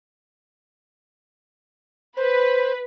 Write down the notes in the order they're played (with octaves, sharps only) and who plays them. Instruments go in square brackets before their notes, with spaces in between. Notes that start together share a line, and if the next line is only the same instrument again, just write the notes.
[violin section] B4 [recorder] C5